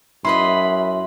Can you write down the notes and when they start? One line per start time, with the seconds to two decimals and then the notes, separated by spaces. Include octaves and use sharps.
0.25 F#2 E4 B4 D#5 B5 C6